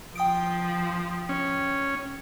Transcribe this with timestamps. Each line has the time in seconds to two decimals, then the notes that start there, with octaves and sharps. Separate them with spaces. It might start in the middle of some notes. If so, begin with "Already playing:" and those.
0.15 F3 G5 D#6 D7
1.29 C#4